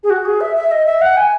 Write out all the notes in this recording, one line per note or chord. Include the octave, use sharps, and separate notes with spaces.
G#4
F#4
G#4
E5
E5
D#5
E5
F#5
G#5